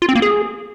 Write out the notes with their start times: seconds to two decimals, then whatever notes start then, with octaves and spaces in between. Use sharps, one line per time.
0.02 F4
0.09 C4
0.15 A#3
0.22 G#4